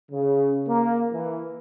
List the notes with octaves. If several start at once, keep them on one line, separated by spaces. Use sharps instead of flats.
C#3
A#3
E3